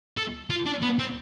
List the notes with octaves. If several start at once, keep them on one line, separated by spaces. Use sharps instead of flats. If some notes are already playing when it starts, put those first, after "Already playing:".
A4
F4
D4
B3
C4